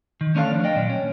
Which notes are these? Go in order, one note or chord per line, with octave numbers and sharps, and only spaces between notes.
D#3
A3 C#4 D4 E4 A4 F5
F3
D5 D#5 G5
A#2 F#3
C#4